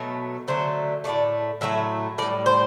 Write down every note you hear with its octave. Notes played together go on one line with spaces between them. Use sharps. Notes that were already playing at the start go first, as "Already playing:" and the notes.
Already playing: B2 F#3 A3
D3 F#3 A3 C5
A2 F#3 A3 D5
A2 F#3 A3 E5
A2 G3 D5
C5